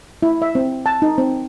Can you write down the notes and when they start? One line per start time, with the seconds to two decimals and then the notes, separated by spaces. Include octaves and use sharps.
0.23 E4
0.42 E5
0.55 C4
0.86 A5
1.02 D#4
1.18 C4